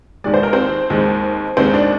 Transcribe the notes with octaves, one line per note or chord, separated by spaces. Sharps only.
D#2 D#3 G#3 D5
C5
A#4
C4 C5
D#2 D#3 G#3
D#2 D#3 G#3 C4 C5
D4 D5